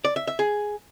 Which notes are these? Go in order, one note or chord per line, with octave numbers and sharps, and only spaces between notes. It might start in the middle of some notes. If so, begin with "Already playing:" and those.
D5
E5
E5
G#4